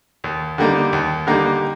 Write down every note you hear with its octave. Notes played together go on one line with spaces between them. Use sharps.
D#2
D3 G3 A#3 D#4
D#2
D3 G3 A#3 D#4